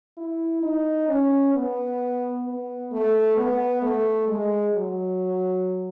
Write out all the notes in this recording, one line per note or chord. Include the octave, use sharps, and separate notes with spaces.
E4
D#4
C#4
B3
B3
A3
B3
A3
G#3
F#3